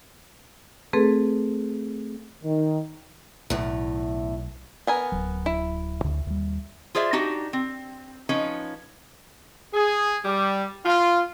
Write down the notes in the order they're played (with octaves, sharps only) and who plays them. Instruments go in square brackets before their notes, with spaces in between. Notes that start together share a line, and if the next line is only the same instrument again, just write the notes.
[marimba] A3 C4 G#4 A4 B4
[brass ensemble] D#3
[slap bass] B1 [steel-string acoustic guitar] E2 A2
[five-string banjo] B3 A#4 G#5
[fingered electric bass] D1 F#3
[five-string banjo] E4
[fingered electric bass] D2 D3
D#2 G3
[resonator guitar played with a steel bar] F4 G#4 C5 D5 E5
D4 D#4 F#4 G4
C4
F3 C#4 D#4 B4 C#5
[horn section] G#4
G3
F4